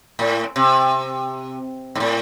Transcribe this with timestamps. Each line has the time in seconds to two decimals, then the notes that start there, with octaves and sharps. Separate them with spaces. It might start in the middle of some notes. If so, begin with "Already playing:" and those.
0.19 A2
0.56 C3
1.95 G#2
2.00 A2